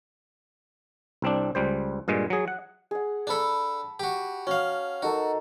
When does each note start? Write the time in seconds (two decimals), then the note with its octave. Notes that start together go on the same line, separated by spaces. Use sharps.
1.22 C2 C4 D4
1.55 C#2 G3 C5
2.08 G2 A#2 G#3
2.30 F#3 G#4
2.48 F#5
2.91 G#4 F#5
3.27 D4 A4 A5 B5
4.00 F#4 G4
4.47 C#4 F#4 F5
5.02 D#4 F#4 A4 A#4